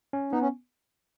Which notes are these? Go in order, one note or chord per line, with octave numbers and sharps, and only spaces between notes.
C#4
B3 D#4
C#4